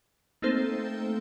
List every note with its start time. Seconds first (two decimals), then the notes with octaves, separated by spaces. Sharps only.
0.42 A3 A#3 C4 D#4 A4 C5